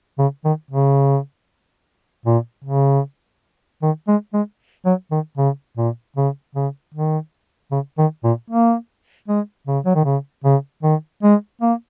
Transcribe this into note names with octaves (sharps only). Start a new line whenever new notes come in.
C#3
D#3
C#3
A#2
C#3
D#3
G#3
G#3
F#3
D#3
C#3
A#2
C#3
C#3
D#3
C#3
D#3
A#2
A#3
G#3
C#3
F#3
D#3
C#3
C#3
D#3
G#3
A#3